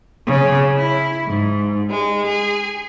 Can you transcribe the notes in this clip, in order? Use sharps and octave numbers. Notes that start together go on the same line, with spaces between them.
C#3
E4
G#2
G#3
G#4